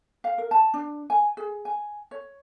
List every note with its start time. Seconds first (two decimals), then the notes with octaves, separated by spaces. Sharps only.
0.24 F5
0.38 A#4
0.51 A5
0.74 D4
1.10 G#5
1.37 G#4
1.65 G#5
2.11 C#5